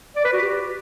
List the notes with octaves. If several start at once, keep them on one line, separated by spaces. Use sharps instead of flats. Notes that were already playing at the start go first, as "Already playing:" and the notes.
D5
B4
F#4
G4